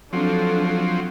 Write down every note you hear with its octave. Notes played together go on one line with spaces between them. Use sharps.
F3 F#3 C4 D4 A4